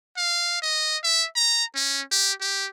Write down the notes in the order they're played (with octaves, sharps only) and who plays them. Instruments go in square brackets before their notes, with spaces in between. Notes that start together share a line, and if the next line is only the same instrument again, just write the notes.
[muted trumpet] F5
D#5
E5
A#5
C#4
G4
G4